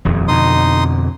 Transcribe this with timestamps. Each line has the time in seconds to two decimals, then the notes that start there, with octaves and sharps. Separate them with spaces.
0.05 D#1 F2
0.28 F2 B2 D3 D#4 C6 D#6